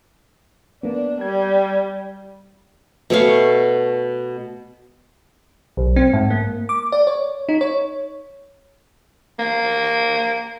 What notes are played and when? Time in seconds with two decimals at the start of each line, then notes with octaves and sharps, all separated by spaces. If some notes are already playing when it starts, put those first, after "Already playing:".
0.83 A#3 B3 D4
1.21 G3 G#6
3.10 B2 A3 C#5 F5
5.77 B1
5.96 C4
6.13 G#2
6.30 A#3
6.69 D6
6.92 D5
7.07 C#5
7.49 D#4
7.61 C#5
9.39 A#3